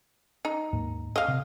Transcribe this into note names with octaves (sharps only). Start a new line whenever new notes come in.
D#4
D#2 G#2 A#3
D#5 F5
C3